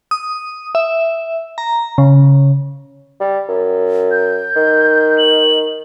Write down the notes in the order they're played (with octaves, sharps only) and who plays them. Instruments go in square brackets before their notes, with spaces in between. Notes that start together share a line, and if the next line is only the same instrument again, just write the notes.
[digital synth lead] D#6
E5
A#5
C#3
[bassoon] G3
F#2
[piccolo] G6
[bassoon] D#3
[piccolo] F#7